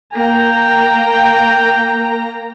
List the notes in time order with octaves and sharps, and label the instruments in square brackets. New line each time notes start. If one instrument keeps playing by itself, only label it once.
[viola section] A#3 A#5 [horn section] G5